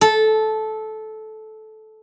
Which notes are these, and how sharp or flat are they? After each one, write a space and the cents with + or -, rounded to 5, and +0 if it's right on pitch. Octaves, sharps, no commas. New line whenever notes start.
A4 -15